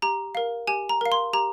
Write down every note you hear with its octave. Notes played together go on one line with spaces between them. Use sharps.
G4 A#5
A#4 F5
G4 G#5
A#5
A#4 F5
C6
G4 A#5